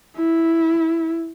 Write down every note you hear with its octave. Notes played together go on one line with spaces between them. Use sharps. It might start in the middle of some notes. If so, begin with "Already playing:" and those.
E4